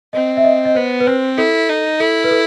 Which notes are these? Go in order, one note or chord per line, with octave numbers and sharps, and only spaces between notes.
C4 D#5
E5
D#5
D#5
B3 C5
B4
C4 C5
E4 A4
D#4
E4 A4
B4
A4